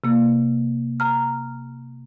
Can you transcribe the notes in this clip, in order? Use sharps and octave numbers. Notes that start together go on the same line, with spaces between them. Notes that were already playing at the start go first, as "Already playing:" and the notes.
C3 A#3
A#5 F6